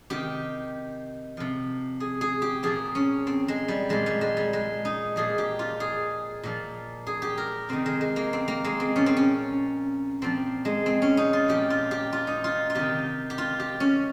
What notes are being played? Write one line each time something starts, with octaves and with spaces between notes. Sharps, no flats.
C3 D#3 G4
C3 F3
G#4
G#4
G4
A#2 F3 G#4
C#4
C4
G#3
G3
A#2 F3 G#3
G3
G#3
G3
G#3
D#4
A#2 F3 G#4
G4
F4
G#4
A#2 F3
G#4
G4
A#4
C3 D#3 C4
G#3
G#3
A#3
C4
A#3
G#3
C4
A#2 F3 C#4
C4
C#4
A#2 F3 C4
G#3
C4
C#4
D#4
F4
A#2 F3 G4
F4
G4
F4
D#4
F4
F4
C3 D#3 G4
G4
F4
G4
C#4